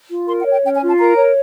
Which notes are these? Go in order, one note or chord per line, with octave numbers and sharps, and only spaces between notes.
F4
A#4 C6
F#5
C#5
G5
C#4 G5
G#5
F4
A5
A#4 A#5
C#5